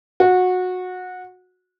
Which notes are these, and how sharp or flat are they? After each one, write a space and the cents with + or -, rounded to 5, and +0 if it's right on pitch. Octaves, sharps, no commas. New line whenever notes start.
F#4 -20